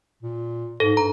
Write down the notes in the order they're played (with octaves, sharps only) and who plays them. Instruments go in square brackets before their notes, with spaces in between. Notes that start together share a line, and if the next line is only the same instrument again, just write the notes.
[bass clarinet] A#2
[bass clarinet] G#2 [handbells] A4
[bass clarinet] G2 [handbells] A#5